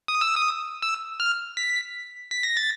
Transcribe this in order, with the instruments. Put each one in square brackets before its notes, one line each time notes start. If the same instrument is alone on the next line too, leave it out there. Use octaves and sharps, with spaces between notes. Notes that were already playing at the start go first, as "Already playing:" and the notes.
[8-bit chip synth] D#6
E6
D#6
E6
F6
B6
B6
A#6
A6